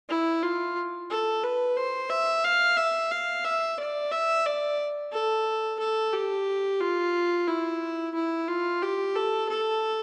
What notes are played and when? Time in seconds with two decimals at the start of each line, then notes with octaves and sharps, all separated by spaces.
0.09 E4
0.42 F4
1.10 A4
1.43 B4
1.76 C5
2.10 E5
2.44 F5
2.77 E5
3.11 F5
3.44 E5
3.78 D5
4.11 E5
4.46 D5
5.13 A4
5.79 A4
6.13 G4
6.80 F4
7.47 E4
8.14 E4
8.48 F4
8.82 G4
9.16 A4
9.49 A4